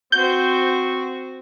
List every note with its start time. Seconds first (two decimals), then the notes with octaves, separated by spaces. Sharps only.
0.12 C4 F#4 C5 G6